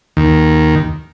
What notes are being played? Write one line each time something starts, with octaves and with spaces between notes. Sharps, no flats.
D#2